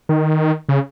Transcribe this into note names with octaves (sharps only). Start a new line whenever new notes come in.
D#3
C#3